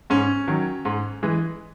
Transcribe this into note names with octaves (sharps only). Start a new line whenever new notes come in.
G#2 C#4
D#3 F#3
G#2
E3 G#3